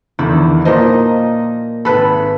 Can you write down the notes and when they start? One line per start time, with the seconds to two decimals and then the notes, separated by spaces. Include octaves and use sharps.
0.19 E2 D3 D#3 E4
0.65 A#2 F3 A#3 D#4 D#5
1.85 G#1 A4 B4 B5